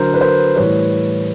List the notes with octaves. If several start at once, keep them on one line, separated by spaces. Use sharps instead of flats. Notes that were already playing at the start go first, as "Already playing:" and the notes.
Already playing: D3 F#3 A#4 C5
B4
A#4 C5
A2 E3 G3 B4 C#5